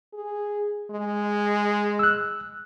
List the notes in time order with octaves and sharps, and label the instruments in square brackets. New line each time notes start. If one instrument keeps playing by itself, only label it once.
[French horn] G#4
G#3
[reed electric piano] E6 F#6